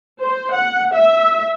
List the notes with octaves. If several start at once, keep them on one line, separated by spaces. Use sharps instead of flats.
C5
F#5
E5